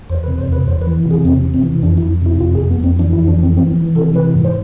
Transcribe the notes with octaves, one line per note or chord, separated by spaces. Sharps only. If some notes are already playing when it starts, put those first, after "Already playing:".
E2 C5
B4
C3
C5
E2 B4
E2 C5
B4
E3
C3
G#4
E2 C4
C3
C4
E3
F2 D4
E4
F2
C3 E4
F2 F4
G#4
F2
B3
F2 C4
E3 D4
E4
F2
D4
E3
C4
E3 C4
E3
C3 A4
E3 B4
G#2
C5